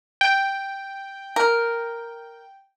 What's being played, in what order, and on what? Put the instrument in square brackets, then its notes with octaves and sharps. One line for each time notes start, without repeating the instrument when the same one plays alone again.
[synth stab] G5
[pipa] A#4